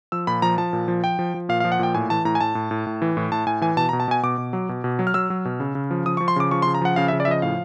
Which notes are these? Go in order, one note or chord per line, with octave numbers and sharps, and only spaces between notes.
F3 E6
A#2 B5
F3 A#5
F3 A5
A#2
F3
F3 G5
F3
F3
A#2 F5
F5
F3
F#5
A#2 G5
A2 G#5
E3 A5
A2 A#5
G#5
A2 A5
A2
A2
A2
E3
A2
A2 A5
A2 G#5
E3 G#5
B2 A5
A#5
B2
A5
B2 G#5
B2 D6
B2
F#3
B2
B2
F#3
F6
F#3 E6
F#3
B2
C#3
C#3
F3
F3 D#6
C#6
F3
C6
C#3 D6
F3 C#6
C6
C#3
A#5
F3 F#5
C#3 F5
E5
C#3
D5
E5
F3 D#5
A2 F5